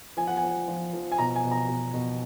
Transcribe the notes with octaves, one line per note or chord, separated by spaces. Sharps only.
F3 G#5
F#5
G#5
F3
F3
F3
G#5
B2 A#5
G#5
B2
A#5
B2
B2